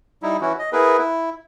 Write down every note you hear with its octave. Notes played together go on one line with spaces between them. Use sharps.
G3 D#4 E4
E3 C#4 E4 F#4
D#5
B3 E4 G#4 A#4 B4
E4